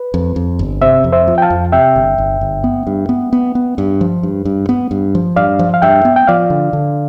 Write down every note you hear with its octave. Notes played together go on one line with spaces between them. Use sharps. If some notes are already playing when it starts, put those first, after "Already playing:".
Already playing: B4
F2
F2
G1
C3 C5 E5
F2
C5 E5
F3
G5
F5 A5
F2
C3 E5 G5
G1
G1
G1
B3
G2
B3
B3
B3
G2
F3
G2
G2
B3
G2
F3
G2 D5 F5
F3
F5
G2 E5 G5
B3
G5
F3 D5 F5
D3
D3